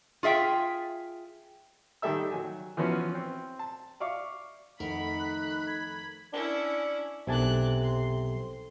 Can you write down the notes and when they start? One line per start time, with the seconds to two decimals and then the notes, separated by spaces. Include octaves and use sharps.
0.23 F4 G#4 E5 G5
2.02 D#3 G3 A4 E5 E6
2.32 F#3 G#5
2.77 E3 F3 B3 C#4 F#4
3.15 C4
3.59 A5
4.00 D5 E5 F5 C#6 D6
4.80 F2 D#3 A3 A#4 F#5 B5
5.19 F#6
5.67 G#6
6.33 C#4 D4 E4 A#4
7.27 B1 C3 D4 A4 G#5 A5 F#6
7.82 C6